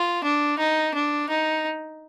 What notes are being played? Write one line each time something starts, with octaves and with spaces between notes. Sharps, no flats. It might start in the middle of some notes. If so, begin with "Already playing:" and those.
Already playing: F4
D4
D#4
D4
D#4